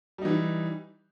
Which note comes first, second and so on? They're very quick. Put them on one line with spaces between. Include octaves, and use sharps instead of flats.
G3 D#4 E3